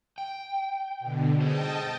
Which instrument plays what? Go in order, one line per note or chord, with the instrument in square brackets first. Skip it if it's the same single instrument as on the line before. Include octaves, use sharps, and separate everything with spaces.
[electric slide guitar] G5
[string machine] B2 D3
[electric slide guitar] G#4 C5 [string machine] D#5 G5 A5